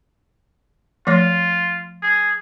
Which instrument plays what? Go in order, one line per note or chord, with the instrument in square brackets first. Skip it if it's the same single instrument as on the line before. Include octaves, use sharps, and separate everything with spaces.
[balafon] F3 A3 C#5 [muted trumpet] F4
[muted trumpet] G#4